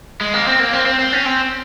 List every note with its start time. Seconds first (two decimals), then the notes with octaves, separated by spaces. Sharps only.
0.21 G#3
0.34 A#3
0.47 C4
0.60 A#3
0.73 C4
0.86 C4
0.99 C4
1.13 C#4
1.26 C4